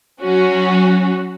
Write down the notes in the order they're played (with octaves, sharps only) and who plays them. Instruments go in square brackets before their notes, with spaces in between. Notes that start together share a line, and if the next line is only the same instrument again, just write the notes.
[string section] F#3 C#4 F#4